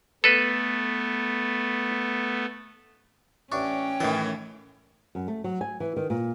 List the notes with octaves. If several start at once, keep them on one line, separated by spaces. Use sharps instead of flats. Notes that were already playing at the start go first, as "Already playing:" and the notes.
A3 B3 A4 B4
A1 C#4 D4 G5 C#6
F#2 A2 D#3 E3 A4
F#2
A3
F#3
G#5
E3
D#3
A#2